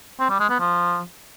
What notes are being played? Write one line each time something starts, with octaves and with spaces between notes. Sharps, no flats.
C4
G3
G#3
B3
F3